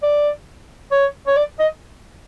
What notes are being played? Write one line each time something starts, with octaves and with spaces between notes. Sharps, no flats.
D5
C#5
C#5
D5
D#5